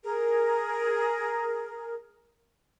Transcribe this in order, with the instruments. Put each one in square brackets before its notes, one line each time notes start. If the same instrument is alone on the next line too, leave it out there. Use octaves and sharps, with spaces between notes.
[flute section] G#4 A#4